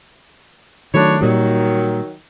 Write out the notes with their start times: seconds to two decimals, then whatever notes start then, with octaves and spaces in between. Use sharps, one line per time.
0.94 D#3 F#3 A3 D4 E4 C#5
1.21 A#2 D#3 F#3 G3